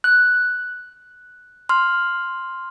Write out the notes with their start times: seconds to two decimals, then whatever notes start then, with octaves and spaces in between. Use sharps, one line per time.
0.04 F#6
1.69 C6 F6